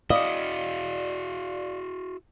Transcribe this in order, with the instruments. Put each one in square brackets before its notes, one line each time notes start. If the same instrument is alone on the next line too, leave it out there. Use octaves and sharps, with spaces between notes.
[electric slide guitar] E4 F#4 [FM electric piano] D5 F5 [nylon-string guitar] D#5